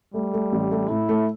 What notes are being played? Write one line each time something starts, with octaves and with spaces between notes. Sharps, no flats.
G3 A3
A3
A1
A3
A2 E4
A3